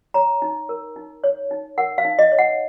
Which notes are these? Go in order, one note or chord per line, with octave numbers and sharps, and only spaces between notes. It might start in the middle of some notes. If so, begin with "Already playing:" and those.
C#5 A#5
D#4
A#4
D#4
C#5
D#4
A#4 F#5
F5
D#4
D#5
C#5
F#5